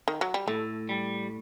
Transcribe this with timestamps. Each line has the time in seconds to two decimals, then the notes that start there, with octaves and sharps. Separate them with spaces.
0.08 D#3
0.21 F#3
0.34 G3
0.48 A2 A3
0.89 G3